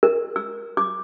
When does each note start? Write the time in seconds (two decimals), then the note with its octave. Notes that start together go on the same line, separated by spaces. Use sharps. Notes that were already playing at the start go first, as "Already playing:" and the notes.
0.03 A#4
0.36 E6
0.77 D6